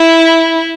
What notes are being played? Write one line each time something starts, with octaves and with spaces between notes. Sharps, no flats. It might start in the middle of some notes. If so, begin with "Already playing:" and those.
Already playing: E4